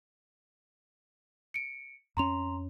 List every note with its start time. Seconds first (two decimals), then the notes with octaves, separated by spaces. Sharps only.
1.54 C#7 D7
2.17 F2 C#4 A#5 C6 F7